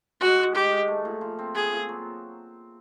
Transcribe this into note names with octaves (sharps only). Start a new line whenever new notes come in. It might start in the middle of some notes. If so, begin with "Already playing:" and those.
G#3 F#4
G#2
D#3 G4
G#2
A3
A#2
F3
C4
B3 G#4
A#2
F#3